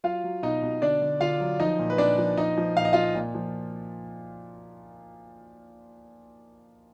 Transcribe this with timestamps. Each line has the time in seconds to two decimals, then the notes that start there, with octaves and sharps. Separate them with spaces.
0.04 F#3 F4 F5
0.24 F#3
0.43 B2 D#4 D#5
0.62 B2
0.82 D3 D4 D5
1.02 D3
1.21 D3 F4 F5
1.40 F#3
1.60 F3 D#4 D#5
1.79 A#2
1.90 B4
1.98 A#2 D4 D5
2.18 F3
2.37 F3 D#4 D#5
2.58 F3
2.76 A#2 F5
2.85 D#5
2.93 F3 F4 F5
3.15 A#2
3.35 F3